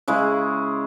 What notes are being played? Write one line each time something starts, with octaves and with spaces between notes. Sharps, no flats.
C#3 G#3 E4